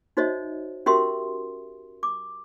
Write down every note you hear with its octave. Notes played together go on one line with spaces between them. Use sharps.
D#4 F#4 C5 C#5 D#5 E5
C#4 F#4 G4 A#4 E5 C6
D6